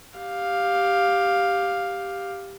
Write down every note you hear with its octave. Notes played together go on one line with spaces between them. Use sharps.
G4 F5